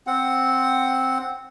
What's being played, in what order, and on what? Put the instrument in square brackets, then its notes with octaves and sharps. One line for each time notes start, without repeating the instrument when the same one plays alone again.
[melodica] C4 F#5